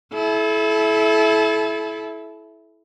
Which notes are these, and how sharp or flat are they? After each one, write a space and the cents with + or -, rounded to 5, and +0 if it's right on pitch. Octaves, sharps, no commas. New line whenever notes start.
E4 +0 A4 -35